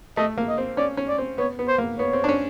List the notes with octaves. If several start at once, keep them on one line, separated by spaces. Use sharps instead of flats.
A3 D#5
A#3
D#5
C4
C#4 D5
C#4
D5
C4
B3 C#5
B3
C5
A#3
B3 C#5
C4
D4
C#4